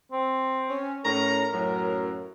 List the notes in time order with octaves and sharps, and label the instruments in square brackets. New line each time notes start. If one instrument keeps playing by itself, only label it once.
[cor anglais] C4
[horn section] C#4
[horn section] A2 C#4 A#5 [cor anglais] A#4
[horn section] F#2 A2 F#3